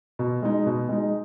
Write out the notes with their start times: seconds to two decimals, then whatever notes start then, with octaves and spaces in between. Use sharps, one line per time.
0.19 B2
0.43 G#3 D#4
0.66 B2
0.89 G#3 D#4